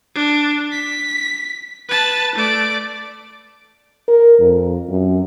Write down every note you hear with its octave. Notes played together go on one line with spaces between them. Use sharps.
D4
B6
B4 A5
A3 D5
A#4
F2
F#2